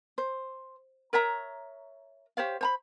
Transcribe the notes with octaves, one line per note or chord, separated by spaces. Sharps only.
C5
A#4 C#5 E5 A#5
G4 C5 C#5 F5
C5 A#5 B5